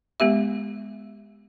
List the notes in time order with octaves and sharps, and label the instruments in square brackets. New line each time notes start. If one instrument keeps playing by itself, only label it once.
[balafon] G#3 B3 G4 E5